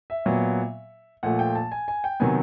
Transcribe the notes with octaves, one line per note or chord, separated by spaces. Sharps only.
E5
A#2 F#3 B3
A#2 F3 A3 F#5
G5
A5
G#5
G#5
G5
C3 D#3 F#3 B3 G#5